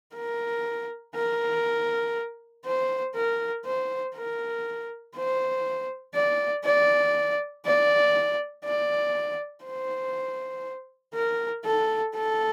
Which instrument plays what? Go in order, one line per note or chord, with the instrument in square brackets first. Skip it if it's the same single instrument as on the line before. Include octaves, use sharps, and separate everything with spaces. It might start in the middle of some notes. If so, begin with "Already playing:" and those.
[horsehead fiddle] A#4
A#4
C5
A#4
C5
A#4
C5
D5
D5
D5
D5
C5
A#4
A4
A4